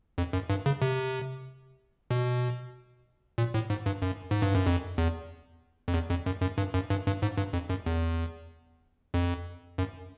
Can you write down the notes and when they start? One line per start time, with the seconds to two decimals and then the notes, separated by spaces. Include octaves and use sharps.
0.18 F2
0.33 F#2
0.50 G2
0.66 C#3
0.82 C3
2.11 B2
3.38 A#2
3.54 A2
3.70 G#2
3.86 G2
4.02 F#2
4.31 G#2
4.42 G2
4.55 F#2
4.67 F2
4.98 E2
5.88 F2
5.94 E2
6.10 F2
6.26 F#2
6.42 F#2
6.58 G2
6.74 F#2
6.90 G2
7.07 G2
7.22 G#2
7.37 G2
7.53 F2
7.70 F#2
7.86 E2
9.14 F2
9.78 F#2